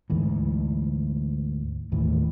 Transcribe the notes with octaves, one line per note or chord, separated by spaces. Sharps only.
D2 G#2 E3
D#2 A2 E3